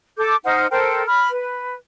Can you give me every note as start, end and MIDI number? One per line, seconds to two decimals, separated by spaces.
0.17 0.36 69
0.17 0.36 86
0.17 0.36 91
0.45 0.66 63
0.45 0.66 72
0.45 0.66 78
0.45 0.66 89
0.71 1.03 69
0.71 1.03 70
0.71 1.03 72
0.71 1.03 79
1.06 1.29 83
1.06 1.29 89
1.30 1.76 71